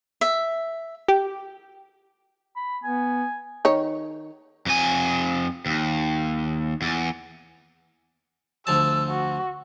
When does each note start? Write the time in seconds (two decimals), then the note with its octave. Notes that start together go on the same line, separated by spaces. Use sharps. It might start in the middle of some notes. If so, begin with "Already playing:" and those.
0.21 E5
1.08 G4
2.56 B5
2.84 B3 G#5
3.65 D#3 C#5
4.66 F2 G#5
5.66 D#2
6.82 E2
8.67 D2 F3 A5 E6
9.09 F#4